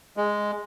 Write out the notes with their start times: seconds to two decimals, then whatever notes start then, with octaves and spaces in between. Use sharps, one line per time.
0.17 G#3